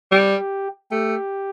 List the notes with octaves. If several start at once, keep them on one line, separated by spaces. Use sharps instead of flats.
G3 G4
A3 G4